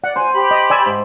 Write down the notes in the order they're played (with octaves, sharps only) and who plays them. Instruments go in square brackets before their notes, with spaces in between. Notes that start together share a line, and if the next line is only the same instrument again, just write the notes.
[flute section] D5 [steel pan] F#5
[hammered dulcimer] C5 [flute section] G#5
[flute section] G4 B5
[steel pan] D#5
D5 G#5 E6
[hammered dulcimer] G#2